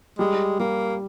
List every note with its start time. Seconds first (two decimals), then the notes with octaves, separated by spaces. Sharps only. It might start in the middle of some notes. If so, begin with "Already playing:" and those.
0.19 G3 G#3
0.59 G3 A#3